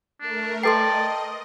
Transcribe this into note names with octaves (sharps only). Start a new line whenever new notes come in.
A3 D4 A#4
A4 B4 D5 D#5 G5 A5 C6 C7